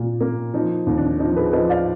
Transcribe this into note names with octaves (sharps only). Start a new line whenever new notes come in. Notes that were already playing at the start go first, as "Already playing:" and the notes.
Already playing: A#2
A#3
F3 D#4
D#2
D4
F3 D#4
G#4 B4
F3 B4 D#5
D5 F5